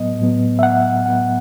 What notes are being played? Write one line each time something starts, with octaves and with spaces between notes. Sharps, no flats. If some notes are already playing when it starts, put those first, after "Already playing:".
Already playing: A2 F#3 B3 D#5
A2 F#3 B3
E5
F#5
A2 F#3 B3 F#5